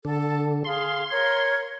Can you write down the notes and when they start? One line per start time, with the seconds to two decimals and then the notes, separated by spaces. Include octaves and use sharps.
0.05 D3 A4 A5
0.64 G#4 F5 C6
1.10 A#4 C#5 G#6